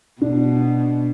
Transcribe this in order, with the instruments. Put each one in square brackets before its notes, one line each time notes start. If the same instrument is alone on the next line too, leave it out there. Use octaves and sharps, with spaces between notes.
[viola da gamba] B2 [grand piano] D4